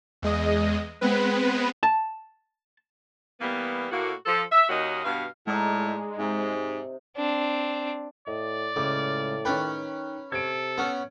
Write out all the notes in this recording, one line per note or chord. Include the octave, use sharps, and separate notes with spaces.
E2 G#3 D#5
G#3 B3 C4 B4
A5
E3 G3 A#3 B3
A2 A#3 F#4
F3 A4
E5
D#2 D#3 A#3 C#4 F#4 D#5
G2 B2 B3 F#4 F5
A2 G#3 D#4 D5 D#5
G#2 C3
C4 D4
A2 D5 D#5
C#2 A2 D6
D#3 C#4 B4 G5
C3 A4 G#6 D7
B3 C#4